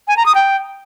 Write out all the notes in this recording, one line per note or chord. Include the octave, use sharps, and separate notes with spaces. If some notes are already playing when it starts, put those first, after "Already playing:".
G#5
A#5
D#6
G5